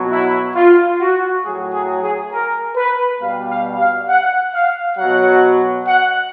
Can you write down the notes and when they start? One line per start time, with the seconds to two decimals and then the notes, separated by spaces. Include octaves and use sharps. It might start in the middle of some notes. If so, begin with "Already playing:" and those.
Already playing: B2 F#3
0.11 E4
0.55 F4
1.00 F#4
1.44 A2 F#3 G#4
1.73 G#4
2.02 G#4
2.32 A#4
2.76 B4
3.21 B2 G3 F5
3.51 F5
3.79 F5
4.09 F#5
4.53 F5
4.97 B2 F#3 F#5
5.87 F#5